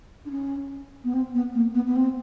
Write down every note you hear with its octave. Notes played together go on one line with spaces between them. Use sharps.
D4
C#4
B3
C4
B3
A#3
B3
B3
C4